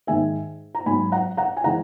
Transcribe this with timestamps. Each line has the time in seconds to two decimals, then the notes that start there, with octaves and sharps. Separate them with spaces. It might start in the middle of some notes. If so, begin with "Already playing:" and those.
0.07 G#2 D#3 G#3 E5 G#5
0.75 A#5
0.86 G#2 F#3 G#5 B5
1.12 F#5 A#5
1.37 F#5 A#5
1.57 G#5
1.64 E3 G#3 F#5 A#5